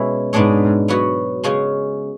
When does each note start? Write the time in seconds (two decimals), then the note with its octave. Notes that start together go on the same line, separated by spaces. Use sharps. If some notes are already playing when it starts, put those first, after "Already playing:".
Already playing: B2 G#3 C#4 E4
0.33 G#2 G#3 B3 D4 G#4 C#5
0.88 F#3 B3 F#4 C#5
1.44 C#3 G#3 C#4 G#4